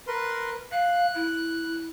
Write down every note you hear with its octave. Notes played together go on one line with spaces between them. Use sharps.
A#4 B4 C6
F5 F#6
E4